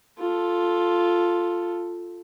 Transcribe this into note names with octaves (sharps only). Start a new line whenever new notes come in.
F4 A4